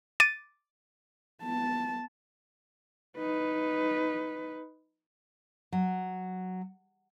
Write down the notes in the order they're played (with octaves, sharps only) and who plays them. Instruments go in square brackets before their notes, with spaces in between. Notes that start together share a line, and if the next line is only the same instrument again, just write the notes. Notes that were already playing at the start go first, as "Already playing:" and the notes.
[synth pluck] D6 A6 D#7
[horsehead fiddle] B3 A5
D#4 B4
[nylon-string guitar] F#3